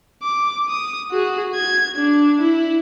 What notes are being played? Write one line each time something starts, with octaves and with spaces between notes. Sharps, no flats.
D6
D#6
F#4 G#4
G#6
D4
E4